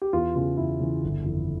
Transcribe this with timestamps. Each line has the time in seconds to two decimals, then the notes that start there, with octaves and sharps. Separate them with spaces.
0.02 G4
0.13 E2 F4
0.35 C#3 E3 F4
0.57 E2 E4
0.80 C#3 E3
1.03 G1
1.25 F2 E3